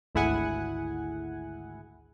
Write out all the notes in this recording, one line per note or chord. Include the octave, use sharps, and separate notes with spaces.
G#1 D2 E4 G#4 F#5 G#5